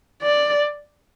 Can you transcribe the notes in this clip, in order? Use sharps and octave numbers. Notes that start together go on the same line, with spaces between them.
D5